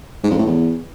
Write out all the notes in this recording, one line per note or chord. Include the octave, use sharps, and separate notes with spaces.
G#2
F2
A2
E2